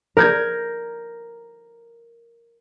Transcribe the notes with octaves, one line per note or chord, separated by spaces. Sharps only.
A#4 G6 G#6